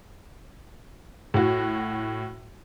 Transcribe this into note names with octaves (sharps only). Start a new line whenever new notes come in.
A2 F#4